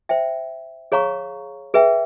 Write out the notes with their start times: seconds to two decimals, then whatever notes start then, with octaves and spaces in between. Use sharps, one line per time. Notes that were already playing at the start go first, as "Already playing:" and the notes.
0.09 C5 E5 G5
0.92 G#4 C#5 F5 A#5 C#6
1.74 G#4 B4 E5 G5